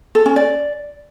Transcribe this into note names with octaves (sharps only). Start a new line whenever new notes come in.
A4
C#4
D5